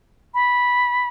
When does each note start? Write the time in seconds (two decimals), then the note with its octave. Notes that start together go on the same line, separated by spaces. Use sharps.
0.34 B5